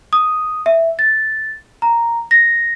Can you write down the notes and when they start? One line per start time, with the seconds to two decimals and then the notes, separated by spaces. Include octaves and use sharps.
0.13 D#6
0.66 E5
0.99 A6
1.82 A#5
2.31 A#6